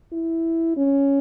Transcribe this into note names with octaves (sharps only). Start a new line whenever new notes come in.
E4
C#4